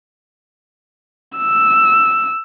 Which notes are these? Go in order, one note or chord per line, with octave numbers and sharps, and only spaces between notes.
E6